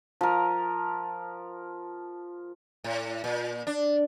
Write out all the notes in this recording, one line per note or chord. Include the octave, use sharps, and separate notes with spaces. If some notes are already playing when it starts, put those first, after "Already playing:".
F3 A#4
A2
A#2
D4